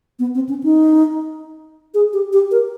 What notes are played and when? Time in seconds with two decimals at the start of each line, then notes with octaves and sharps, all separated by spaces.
0.19 B3
0.35 C4
0.49 C#4
0.63 D#4
1.94 G#4
2.13 G4
2.33 G4
2.51 A#4